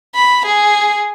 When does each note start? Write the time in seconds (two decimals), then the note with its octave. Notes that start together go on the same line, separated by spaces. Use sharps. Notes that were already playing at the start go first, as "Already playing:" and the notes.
0.15 B5
0.45 G#4